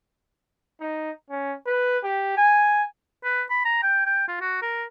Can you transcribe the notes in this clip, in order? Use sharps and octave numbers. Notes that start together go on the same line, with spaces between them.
D#4
C#4
B4
G4
G#5
B4
B5
A#5
G5
G5
F4
F#4
A#4